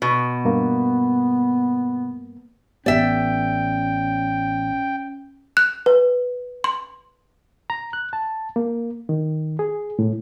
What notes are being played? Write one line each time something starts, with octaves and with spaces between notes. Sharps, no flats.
B2 B3
G2 A#3
A1 B3 C#4 D5 E5 G5
F#6
B4
C6
A#5
F#6
A5
A#3
D#3
G#4
A2